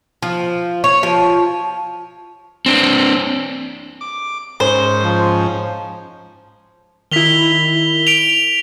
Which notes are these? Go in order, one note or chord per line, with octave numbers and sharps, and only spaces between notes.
F3
C#5
F3
C4 D4
D6
G#2 C#4 C5
F3
D#3 E4 B6 F7 G7
D7 F7